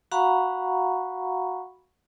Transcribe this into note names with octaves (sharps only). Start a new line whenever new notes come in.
F#4 F5 F#5 A#5 B5 C#6